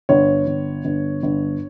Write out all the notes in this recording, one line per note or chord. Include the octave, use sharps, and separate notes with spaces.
G1 C#5
G1
G1
G1